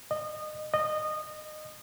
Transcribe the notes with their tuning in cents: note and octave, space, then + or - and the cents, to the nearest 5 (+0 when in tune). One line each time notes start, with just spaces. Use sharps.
D#5 -25
D#5 -20